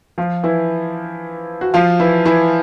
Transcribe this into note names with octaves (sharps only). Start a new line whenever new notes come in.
F3 F4
E3 E4
F#4
F3 F4
E3 E4
E3 E4